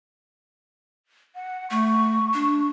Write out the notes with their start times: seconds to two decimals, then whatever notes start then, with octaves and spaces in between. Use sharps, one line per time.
1.35 F#5
1.71 A3 C#6
2.34 D4